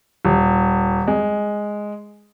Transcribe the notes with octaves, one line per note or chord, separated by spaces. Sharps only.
D#1
G#3